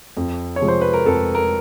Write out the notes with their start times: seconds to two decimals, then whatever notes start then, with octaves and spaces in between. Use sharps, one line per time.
0.17 F2
0.56 C#5
0.61 C3 F3 G#3
0.68 C5
0.81 B4
0.93 A#4
1.06 F2 A4
1.35 A#4